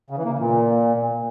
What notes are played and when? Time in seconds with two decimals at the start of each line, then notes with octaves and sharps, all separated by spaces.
0.10 C#3
0.17 E3
0.25 A#3
0.32 C#3
0.39 A#2